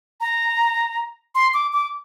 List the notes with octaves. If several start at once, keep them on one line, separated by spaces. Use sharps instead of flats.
A#5
C6
D6
D6